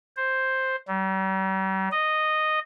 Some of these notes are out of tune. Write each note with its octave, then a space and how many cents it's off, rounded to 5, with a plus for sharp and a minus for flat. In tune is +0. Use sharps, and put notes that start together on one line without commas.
C5 +5
G3 -45
D#5 -10